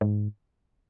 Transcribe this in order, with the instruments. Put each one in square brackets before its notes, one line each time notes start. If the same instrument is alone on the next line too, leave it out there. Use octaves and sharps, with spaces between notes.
[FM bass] G#2